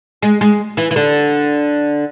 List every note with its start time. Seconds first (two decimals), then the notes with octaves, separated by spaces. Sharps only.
0.22 G#3
0.41 G#3
0.77 E3
0.91 E3
0.96 D3